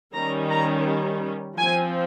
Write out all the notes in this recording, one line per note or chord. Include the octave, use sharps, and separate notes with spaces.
D#3 G3 C#4 A#5
A#5
F3 C4 G#5